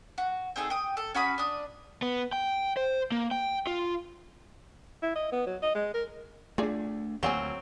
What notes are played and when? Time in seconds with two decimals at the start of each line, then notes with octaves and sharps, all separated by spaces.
0.18 F#4
0.56 C4 D#4 G#4 A4
0.70 G5 D#6
0.97 A4
1.14 C#4 F#4 B5 D#6
1.38 D4 D#6
2.02 B3
2.33 G5
2.77 C5
3.12 A#3
3.31 G5
3.67 F4
5.02 E4
5.15 D#5
5.32 B3
5.47 F#3
5.62 D#5
5.75 G#3
5.94 A#4
6.58 A3 D4 F4 G#4 D5
7.23 D2 F3 F#3 A#3 C4 G#5